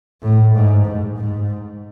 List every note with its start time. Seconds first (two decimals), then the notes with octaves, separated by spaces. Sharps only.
0.23 A2
0.55 G#2
0.85 G#2
1.17 G#2